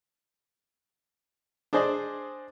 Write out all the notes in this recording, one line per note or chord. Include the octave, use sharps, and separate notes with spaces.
D4 G#4 C5 D5 D#5